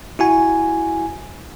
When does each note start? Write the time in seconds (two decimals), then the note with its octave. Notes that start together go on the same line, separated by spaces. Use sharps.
0.19 E4 F#4 G#5